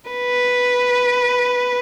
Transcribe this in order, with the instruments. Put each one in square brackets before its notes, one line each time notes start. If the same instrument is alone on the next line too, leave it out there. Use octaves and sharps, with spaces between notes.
[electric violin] B4